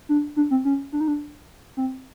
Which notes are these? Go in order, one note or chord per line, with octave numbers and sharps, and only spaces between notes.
D4
D4
C4
C#4
D4
D#4
D4
C4